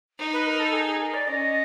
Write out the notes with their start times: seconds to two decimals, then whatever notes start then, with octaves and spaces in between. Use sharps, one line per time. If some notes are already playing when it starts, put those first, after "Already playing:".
0.18 D#4
0.33 B4
0.46 A#4
0.59 A4
0.73 G#4
0.87 G#4
1.00 A#4
1.14 D5
1.27 C#4 D#5